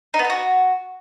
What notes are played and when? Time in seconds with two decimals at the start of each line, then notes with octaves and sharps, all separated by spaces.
0.14 D#4
0.19 B3
0.24 A4
0.30 F#4